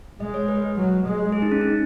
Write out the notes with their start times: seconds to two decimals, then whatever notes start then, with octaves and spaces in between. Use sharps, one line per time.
0.20 G#3 D#5
0.34 C#5
0.48 B4
0.62 B4
0.76 F#3
1.05 G#3
1.32 G#4
1.42 D#4
1.52 C#4
1.61 D#4